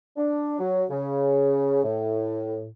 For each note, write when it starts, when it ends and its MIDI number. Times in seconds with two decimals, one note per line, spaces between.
0.17 0.57 62
0.59 0.84 54
0.90 1.81 49
1.83 2.65 45